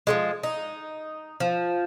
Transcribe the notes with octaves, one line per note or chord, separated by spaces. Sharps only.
F3 F#3 G#3
D#4
F3